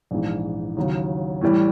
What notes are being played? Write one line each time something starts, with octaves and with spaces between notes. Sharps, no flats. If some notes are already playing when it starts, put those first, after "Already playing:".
A#1 G#2 E3
D#2 C#3 F#3
A2 E3 G3